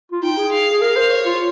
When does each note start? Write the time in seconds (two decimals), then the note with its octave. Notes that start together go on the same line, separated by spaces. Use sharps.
0.12 F4
0.23 D#4 G5
0.37 G#4
0.52 F5
0.72 G#4
0.81 A#4 F5
0.97 C5
1.11 C#5
1.26 F4